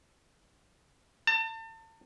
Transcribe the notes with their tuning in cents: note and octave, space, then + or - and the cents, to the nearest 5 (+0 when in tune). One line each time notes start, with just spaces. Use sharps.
A5 +35